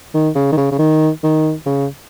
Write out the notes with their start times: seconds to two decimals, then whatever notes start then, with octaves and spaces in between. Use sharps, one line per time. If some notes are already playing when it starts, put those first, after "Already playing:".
0.14 D#3
0.35 C#3
0.52 D#3
0.57 C#3
0.71 C#3
0.79 D#3
1.23 D#3
1.66 C#3